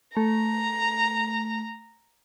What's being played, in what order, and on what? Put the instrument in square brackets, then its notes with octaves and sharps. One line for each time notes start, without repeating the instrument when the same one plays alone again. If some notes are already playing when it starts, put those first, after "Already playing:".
[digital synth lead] A3 [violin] A#5